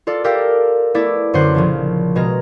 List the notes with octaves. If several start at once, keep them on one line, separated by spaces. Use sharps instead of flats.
F4 A4 D5
G4 A4 A#4 E5 F5 G5
A3 B3 E4 D5 E5
F#2 D3 C5 F#5 C6 F#6
A#1 C#3 F3
B2 G#3 A#5 F6